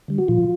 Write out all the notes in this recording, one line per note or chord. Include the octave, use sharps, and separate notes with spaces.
D3 G3
F#4
A#2 F3 F4